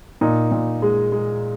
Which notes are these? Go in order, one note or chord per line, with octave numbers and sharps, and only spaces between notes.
A#2 D#4
A#2
G#3
G#3